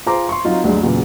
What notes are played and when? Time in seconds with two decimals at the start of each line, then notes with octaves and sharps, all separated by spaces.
0.06 F4 G#4 C5 A#5 D6
0.29 C6 C#6
0.45 F#3 C4 D#4 F4
0.64 D2 G2 D3 F#3 G#3
0.83 E2 A#2 C#3 E3 F#3